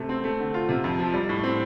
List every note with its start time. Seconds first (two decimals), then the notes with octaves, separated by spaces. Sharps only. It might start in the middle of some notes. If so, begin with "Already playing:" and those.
Already playing: C3 A3
0.09 C4
0.24 A3
0.40 D3
0.54 F4
0.69 C3
0.84 F2
0.99 F3
1.14 G3
1.29 A2
1.44 C4